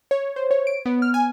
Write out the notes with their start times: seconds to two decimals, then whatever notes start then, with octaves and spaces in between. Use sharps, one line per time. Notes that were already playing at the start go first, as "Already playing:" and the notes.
0.11 C#5
0.36 C5
0.51 C#5
0.67 D7
0.85 B3
1.02 F6
1.14 G#5